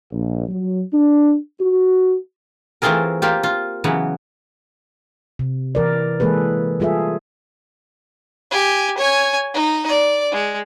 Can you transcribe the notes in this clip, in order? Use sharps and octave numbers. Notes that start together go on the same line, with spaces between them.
A#1
F#3
D4
F#4
E3 A3 C4 F4 G#4 A#4
A#3 F4 G4
F4
C#3 E3 F#3 B3
C3
E3 A#4 D5
E3 G#3 A#3 G#4 A4 B4
G3 F4 G#4 A4 E5
G4 G#5
C#5 G#5
D#4
D5
G#3